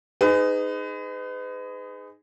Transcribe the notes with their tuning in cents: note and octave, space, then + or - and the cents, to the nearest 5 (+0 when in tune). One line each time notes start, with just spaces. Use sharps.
D#4 -5 G#4 +0 B4 +40